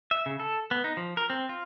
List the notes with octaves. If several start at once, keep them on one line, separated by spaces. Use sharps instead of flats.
E5
C#3
A4
B3
D#4
F3
A#4
C4
F4